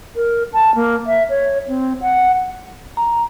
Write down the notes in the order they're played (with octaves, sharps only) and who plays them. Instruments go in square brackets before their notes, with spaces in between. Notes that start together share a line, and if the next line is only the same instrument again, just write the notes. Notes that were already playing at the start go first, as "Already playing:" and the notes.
[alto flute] A#4
A5
A#3
E5
C#5
C4
F#5
[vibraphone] A#5